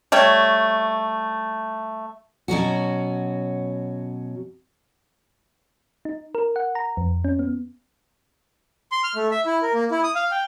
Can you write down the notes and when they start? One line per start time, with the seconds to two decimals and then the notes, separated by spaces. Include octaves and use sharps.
0.12 G3 A3 C#5
2.48 B2 F#3 C#4 F#4
6.05 D#4
6.35 A#4
6.56 F#5
6.75 A#5
6.97 F2
7.24 C#4
7.39 B3
8.92 C6
9.04 F6
9.16 A3
9.31 E5
9.46 E4
9.62 A#4
9.74 A#3
9.91 E4
10.03 D#6
10.15 F5
10.32 G5